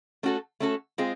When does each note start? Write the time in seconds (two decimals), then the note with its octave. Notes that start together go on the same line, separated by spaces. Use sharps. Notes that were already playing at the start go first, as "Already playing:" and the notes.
0.23 A3 C#4 F#4 A4
0.60 A3 C#4 F#4 A4
0.98 G#3 C4 F4 G#4